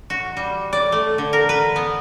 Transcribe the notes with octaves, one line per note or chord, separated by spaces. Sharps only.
F#4
G3
D5
A3
D3
A#4
B4
B3